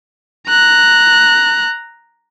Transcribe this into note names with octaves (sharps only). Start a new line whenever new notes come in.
A#5 F#6